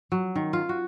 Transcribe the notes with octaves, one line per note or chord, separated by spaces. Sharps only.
F#3
D#3
F4
F#4